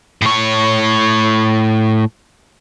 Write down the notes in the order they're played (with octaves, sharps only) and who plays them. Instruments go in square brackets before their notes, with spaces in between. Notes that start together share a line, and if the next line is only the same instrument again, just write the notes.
[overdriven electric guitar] A2 C#5